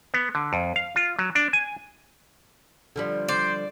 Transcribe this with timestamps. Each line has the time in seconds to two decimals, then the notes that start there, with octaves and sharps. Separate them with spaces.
0.14 B3
0.35 D3
0.53 F2
0.76 F5
0.96 F4
1.19 F#3
1.35 D4
1.53 G#5
2.96 D3 F3 G3
3.28 C5 D5